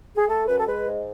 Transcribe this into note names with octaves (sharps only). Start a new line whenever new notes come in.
G#4
A3 A4
F#2 B4
A4
G#3 B4
G#2